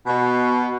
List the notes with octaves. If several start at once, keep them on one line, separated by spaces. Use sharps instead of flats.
B2